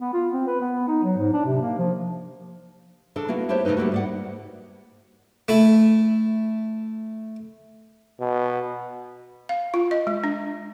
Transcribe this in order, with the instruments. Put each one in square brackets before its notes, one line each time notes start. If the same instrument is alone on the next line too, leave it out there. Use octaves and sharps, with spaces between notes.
[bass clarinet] B3
F4
C4
B4
B3
D#4
F#3
G#2
D4
C3
A#3
F3
[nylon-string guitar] C#3 D4 A4
A#3 B3 E4 F#4
D4 E4 G4 C5 C#5
C#3 E3 A3 D#4 B4
G3 A3 A#3 F#4
G#2 D5 F#5
[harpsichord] A3 E4
[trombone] B2
[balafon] F5
F4
D#5
G#3
D4